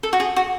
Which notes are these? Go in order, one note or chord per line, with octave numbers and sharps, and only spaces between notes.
A4
F#4
G#4
F#4